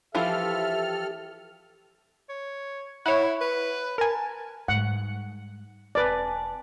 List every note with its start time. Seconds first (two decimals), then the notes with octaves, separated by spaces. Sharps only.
0.15 E3 F3 F4 G4 A4 E5 F6
2.29 C#5
3.06 E4 C#5 F#5
3.41 B4
3.98 A#4 G#5 A5
4.68 G#2 G3 F#5
5.95 E1 C4 B4 D5 G#5 A5